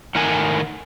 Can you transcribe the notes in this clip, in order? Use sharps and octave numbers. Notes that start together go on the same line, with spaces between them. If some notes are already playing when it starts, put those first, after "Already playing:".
A2 D#3 A#4 F#5 G#5